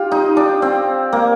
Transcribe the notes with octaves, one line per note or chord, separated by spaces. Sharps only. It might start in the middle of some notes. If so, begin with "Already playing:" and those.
Already playing: F4 G4
D#4
D4
C4
A#3